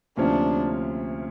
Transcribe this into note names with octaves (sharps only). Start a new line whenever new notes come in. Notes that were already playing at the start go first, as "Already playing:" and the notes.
D2 C3 F3 A#3 C#4 D4